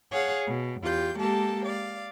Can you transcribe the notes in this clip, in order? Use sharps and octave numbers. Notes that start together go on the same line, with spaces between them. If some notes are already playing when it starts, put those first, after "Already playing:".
G#4 C#5 F5 F#5
B2
E2 F4 G4 G6
G#3 A#3 G4 A4 A5
D5 F5